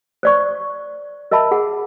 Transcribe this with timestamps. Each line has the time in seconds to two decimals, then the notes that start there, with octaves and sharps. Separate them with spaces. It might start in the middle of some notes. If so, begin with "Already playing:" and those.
0.23 C5 D5 C#6
1.31 A#4 D#5 E5 A5 B5
1.51 G#4 F#5